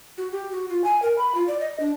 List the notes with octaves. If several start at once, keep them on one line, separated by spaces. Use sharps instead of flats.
F#4
G4
F#4
F4
G#5
A#4
B5
F4
D5
D#5
D4